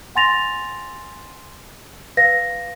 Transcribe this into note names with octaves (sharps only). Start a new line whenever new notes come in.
F#5 G#5 C6 A6 A#6 F7
B4 F5 A#6